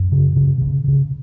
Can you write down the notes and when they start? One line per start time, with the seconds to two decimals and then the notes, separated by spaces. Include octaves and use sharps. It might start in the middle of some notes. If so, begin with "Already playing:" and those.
Already playing: F#2
0.12 C#3
0.36 C#3
0.61 C#3
0.88 C#3